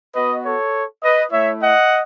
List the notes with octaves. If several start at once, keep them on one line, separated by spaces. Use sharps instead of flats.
B3 F#4 B4 D#5
A4 C#5
B4 D#5
A3 E4 C#5 E5
D#5 F#5